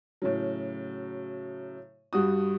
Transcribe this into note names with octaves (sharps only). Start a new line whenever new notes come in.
A2 C#3 F#3
G2 G3 F#4 D#6